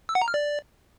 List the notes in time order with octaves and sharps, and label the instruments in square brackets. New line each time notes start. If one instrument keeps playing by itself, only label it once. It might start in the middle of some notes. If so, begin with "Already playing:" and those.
[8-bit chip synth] E6
F#5
A#5
F6
D5